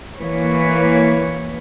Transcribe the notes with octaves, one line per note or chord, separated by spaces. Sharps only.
E3 A#3 B4 C#5